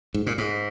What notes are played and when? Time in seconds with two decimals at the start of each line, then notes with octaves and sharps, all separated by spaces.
0.14 G#2
0.26 A#2
0.38 G#2